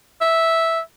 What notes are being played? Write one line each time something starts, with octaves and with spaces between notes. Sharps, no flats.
E5